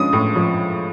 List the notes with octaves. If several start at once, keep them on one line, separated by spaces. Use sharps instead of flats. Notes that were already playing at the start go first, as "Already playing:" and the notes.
Already playing: F3 G#3 C#4 D#6
A2
F3